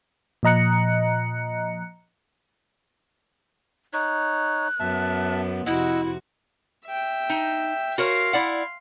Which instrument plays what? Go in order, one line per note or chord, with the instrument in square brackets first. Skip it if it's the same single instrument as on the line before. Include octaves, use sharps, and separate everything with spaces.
[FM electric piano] A#2 F3 D#5 A#5 F#6 C#7
[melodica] D#4 C#5 [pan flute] F#6
[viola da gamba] F#2 B3 [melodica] E5 A5
[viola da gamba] F2 C3 F#4 [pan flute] E4 [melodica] D#5 F#5 E6
[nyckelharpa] E5 G5
[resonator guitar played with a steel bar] D#4
[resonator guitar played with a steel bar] F#4 A#4 C#5 [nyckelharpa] F5 C6
[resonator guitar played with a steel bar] E4 D5 F#5